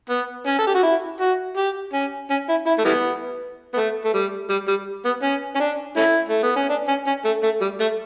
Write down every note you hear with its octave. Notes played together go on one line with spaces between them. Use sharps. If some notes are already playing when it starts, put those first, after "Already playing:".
B3
C#4
A4
G4
F#4
E4
F#4
G4
C#4
C#4
E4
E4
A3
E3 G3 B3
B3
A3
A3
G3
G3
G3
B3
C#4
C#4
D4
A3 C#4 E4
A3
B3
C#4
D4
C#4
C#4
A3
A3
G3
A3